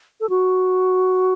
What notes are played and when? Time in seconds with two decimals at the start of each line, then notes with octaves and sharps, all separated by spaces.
0.21 A4
0.30 F#4